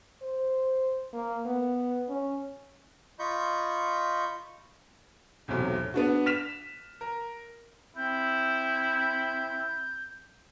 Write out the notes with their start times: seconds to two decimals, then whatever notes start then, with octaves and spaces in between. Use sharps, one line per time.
0.22 C5
1.13 A#3
1.46 B3
2.09 C#4
3.19 F4 D#5 B5 C#6 G6
5.48 B1 E2 A2 C3 F#3
5.94 B3 D4 F#4
6.26 F6 B6 E7 F7
7.01 A#4
7.96 C4 E4 G6